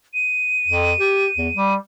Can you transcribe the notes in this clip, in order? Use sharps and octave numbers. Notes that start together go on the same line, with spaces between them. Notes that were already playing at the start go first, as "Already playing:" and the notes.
D#7
F2
G4
E2
G3